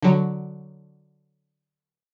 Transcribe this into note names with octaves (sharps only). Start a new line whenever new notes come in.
D3 F#3